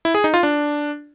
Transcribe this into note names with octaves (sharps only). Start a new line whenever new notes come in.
E4
G#4
D#4
F4
D4